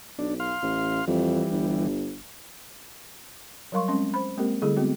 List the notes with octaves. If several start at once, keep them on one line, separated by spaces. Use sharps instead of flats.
B1 D4
F5 C6 F6
A1
F2 E3 G3
G1
F#3 G3 A#4 F5 C6 C#6
G#3 C4 C#4 C6
C5 B5
G#3 A#3 C4 G4 A#4
D3 G3 A3 E4 G#4 A4
G#3 B3 C4 F#4